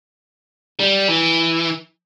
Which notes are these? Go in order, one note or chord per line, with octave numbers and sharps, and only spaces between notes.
G3
E3